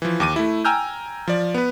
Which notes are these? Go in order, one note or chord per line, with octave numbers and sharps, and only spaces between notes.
E3 F3
D#2 D6 D#7
A3 E4
G5 G#5 A#5 E6 F6 G6
F3 D5
B3 B4